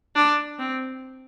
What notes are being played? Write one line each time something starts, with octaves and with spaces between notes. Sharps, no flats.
D4
C4